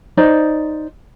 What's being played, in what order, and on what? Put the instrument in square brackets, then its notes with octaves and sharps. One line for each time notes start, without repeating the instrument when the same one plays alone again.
[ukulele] D#4 C5 D5